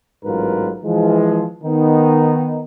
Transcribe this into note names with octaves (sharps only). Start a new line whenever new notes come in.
A1 G#2 F#3 F4 A#4 B4
E3 F3 G#3
D#3 B3 D#4